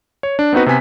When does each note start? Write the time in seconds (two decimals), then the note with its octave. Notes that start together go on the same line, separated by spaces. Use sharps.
0.23 C#5
0.39 D4
0.53 B3 C4 D#4 F#4 B4
0.66 C3 B3 G#5 B6